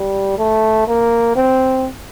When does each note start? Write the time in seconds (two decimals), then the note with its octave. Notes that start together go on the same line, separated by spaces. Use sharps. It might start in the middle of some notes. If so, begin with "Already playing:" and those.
Already playing: G3
0.38 A3
0.87 A#3
1.36 C4